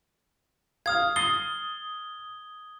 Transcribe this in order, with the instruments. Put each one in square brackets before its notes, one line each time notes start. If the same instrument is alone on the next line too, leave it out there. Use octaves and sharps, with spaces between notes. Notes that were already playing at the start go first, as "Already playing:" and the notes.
[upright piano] F5 F6 [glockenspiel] D#6 G#6
[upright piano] D#6 A6 C7 [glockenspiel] G7